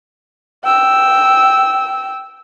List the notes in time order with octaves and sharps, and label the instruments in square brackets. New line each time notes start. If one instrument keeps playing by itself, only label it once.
[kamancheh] G5 E6